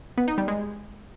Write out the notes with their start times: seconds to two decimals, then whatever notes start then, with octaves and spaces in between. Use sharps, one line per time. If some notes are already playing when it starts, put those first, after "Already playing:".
0.18 B3
0.28 D#4
0.38 G3
0.48 G#3